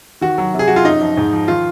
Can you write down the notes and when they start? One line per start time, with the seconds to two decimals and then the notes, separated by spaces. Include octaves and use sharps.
0.21 D#3 F#4
0.38 F#3
0.54 C3
0.59 G#4
0.68 F#3 F#4
0.76 F4
0.85 F#2 D#4
1.01 F3
1.17 G#2
1.33 F3
1.48 D#3 F4